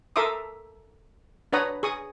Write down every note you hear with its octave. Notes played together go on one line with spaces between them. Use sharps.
A4 A#4 E5 C6 D6 D#6
D4 B4 C#5 F#5 A#5 D#6
G#4 C#6 D#6